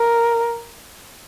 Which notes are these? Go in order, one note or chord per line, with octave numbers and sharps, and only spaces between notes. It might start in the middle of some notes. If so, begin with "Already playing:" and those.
Already playing: A#4